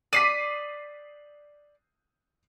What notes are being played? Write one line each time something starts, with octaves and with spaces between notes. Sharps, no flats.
D5 D#6 B6 C7 D#7